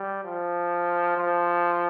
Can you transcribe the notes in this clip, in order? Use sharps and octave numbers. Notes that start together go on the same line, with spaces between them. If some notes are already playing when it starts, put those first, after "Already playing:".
Already playing: G3
F3
F3